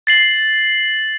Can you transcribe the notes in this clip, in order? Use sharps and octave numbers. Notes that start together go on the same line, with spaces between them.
A6 C7 F#7